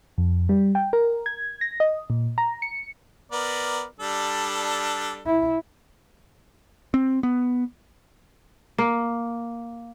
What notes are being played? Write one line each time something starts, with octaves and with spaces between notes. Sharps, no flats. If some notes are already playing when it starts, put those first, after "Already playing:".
F2
G3
G5
A#4
G#6
A#6
D#5
A#2
A#5
C#7
B3 A#4 D5
G3 D4 A4
E4
C4
B3
A#3